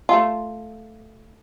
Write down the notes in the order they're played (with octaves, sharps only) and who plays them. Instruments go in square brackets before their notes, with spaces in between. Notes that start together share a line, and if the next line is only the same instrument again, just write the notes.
[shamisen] A3 F4